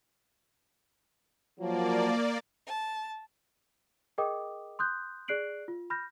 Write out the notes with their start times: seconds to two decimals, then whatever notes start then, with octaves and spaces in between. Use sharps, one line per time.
1.60 F3 F#3 A#3 D5
2.66 A5
4.18 G#4 A#4 D#5 G5 D6 D#6
4.79 C6 D#6 F#6 G6
5.28 G#4 D5 F#6 C7 D7 F#7
5.68 F4
5.90 B5 F6 G6 A#6